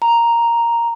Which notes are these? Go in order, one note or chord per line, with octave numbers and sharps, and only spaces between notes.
A#5